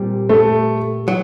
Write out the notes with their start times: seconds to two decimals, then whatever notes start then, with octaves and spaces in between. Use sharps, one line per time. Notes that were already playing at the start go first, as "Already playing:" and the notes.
Already playing: A#2 G3 C4
0.29 A3
1.08 F#3